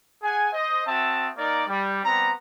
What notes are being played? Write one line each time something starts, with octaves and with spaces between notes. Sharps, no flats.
G#4 F#5 G#5
C5 D#5
C4 F#4 E5 A5 D#6
A#3 D#4 A#4 D5
G3
G3 B3 C4 A#5